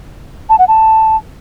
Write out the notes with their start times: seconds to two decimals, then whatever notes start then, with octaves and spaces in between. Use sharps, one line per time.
0.49 A5
0.59 F#5
0.68 A5